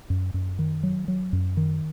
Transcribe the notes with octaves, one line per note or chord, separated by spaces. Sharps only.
F#2
F#2
D#3
F#3
F#3
F#2
D#3